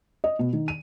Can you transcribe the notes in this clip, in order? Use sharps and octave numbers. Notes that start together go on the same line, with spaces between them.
D#5
B2
D#3
D#7